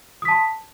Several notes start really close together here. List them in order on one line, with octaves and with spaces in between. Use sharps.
D#6 B6 A5 C6